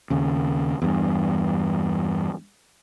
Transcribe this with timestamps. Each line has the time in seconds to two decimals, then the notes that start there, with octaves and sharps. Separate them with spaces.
0.10 D#2 C#3
0.82 E2 G2